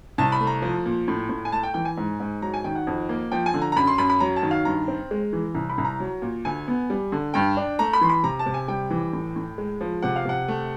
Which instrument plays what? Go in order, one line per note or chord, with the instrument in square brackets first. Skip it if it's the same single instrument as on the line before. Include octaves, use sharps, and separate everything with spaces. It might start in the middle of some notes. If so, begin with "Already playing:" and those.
[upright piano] C2 A5
B5
A3
A#5
F3
A#2
A2
A2
G#5
A3 A5
G5
E3 G5
G#5
G#2
G#2
F#3 A#5
G#5
D#3 G5
F#5
F2
A#3
F3 G5
G#5
D3
A#5
A#5
F#2 B5
C6
F#2 B5
B5
F#3 A#5
A5
D#3
F5
G2 A#5
C4
G#3
E3
C2
B5
C2
A#5
F#3
A#2
D2 G#5
B3
G3
D3
G2 G5
D4
A3 A#5
B5
E3 C6
B5
C3 A#5
A5
C3
G#5
G3 G5
E3
A2
A2
G#3
F3
C3 F#5
F5
C3 F#5
A3